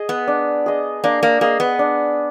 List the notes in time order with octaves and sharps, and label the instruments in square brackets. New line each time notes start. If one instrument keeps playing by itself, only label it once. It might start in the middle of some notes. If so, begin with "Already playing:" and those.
Already playing: [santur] G#4 D#5
[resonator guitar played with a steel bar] B3
[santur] D4
G#4 D#5
[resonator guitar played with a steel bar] A#3 [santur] D4
[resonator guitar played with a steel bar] A#3
[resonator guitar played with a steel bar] A#3 [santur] G#4 D#5
[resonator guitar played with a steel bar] B3
[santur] D4